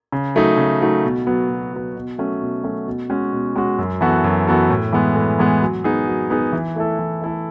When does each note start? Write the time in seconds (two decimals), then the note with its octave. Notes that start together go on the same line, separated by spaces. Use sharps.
0.12 C#3
0.35 F#3 A3 D#4
0.57 C#3
0.81 F#3 A3 D#4
1.04 B2
1.26 F#3 B3
1.49 B2
1.72 F#3 B3
1.95 B2
2.18 F#3 A3 C#4
2.41 B2
2.64 F#3 A3 C#4
2.87 B2
3.10 G#3 C#4 F#4
3.32 B2
3.56 G#3 C#4 F#4
3.79 F#2
4.01 E3 B3 F#4 A4
4.24 F#2
4.47 E3 B3 F#4 A4
4.70 A2
4.92 E3 G#3 B3
5.16 A2
5.39 E3 G#3 B3
5.61 F#3
5.84 B3 D#4 G#4
6.07 F#3
6.30 B3 D#4 G#4
6.53 E3
6.76 A3 E4 A4
6.99 E3
7.22 A3 E4 A4